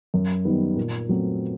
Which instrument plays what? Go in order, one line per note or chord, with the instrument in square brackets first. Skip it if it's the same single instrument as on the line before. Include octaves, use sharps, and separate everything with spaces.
[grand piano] F#2
D#3 G3 B3
A#2
F#3 A3 C4